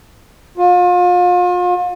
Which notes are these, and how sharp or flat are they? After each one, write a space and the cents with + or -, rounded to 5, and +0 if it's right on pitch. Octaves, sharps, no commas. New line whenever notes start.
F4 +35